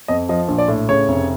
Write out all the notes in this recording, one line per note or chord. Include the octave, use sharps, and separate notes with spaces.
F2 D#5
F3 D#5
A#1
D5
A2
C#3 C#5
F1